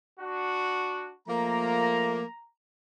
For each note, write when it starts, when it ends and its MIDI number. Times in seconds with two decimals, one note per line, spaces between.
0.20 1.10 62
0.20 1.10 66
1.28 2.22 53
1.28 2.22 57
1.28 2.22 58
1.28 2.42 82